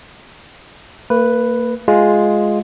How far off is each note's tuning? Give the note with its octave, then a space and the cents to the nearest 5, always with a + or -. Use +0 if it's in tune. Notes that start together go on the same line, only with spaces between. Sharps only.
A#3 -35 B4 +0
G#3 +0 F4 +0